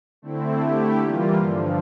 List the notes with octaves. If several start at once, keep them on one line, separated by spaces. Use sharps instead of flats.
D3 A3 C4 E4
D3 A3 E4 G4
E3 G3 A#3 F4
G2 D3 F3